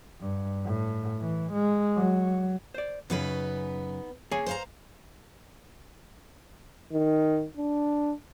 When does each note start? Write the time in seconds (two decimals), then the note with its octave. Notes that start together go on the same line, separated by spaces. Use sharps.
0.21 G2
0.66 A2
1.21 E3
1.53 G#3
1.97 F#3
2.74 C5 D5
3.10 F#2 C#3 B3 D#4 B4
4.31 A#3 G#4 C#5 G#5
4.46 C5 F5 A#5
6.93 D#3
7.57 D4